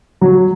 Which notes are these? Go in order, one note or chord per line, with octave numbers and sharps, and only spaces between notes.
F#3